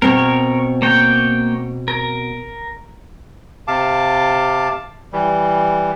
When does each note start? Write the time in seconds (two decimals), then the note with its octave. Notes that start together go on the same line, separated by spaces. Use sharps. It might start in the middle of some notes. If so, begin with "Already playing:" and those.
0.02 B2 C4 A#4 C#5
0.82 A#3 C#5 G5
1.88 A#4
3.68 C3 F5 A5 D6
5.13 E3 G3